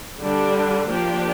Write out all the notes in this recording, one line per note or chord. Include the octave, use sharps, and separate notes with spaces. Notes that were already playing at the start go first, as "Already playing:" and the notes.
D3 G3 D4
F3 A#3 D4 G4